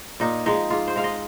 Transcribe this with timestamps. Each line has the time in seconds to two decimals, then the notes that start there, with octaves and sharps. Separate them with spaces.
0.20 A#2 D#4
0.46 F3 G#3 D#4
0.70 G#2 F4
0.88 C5
0.96 G#3 D#4 F5
1.04 D#5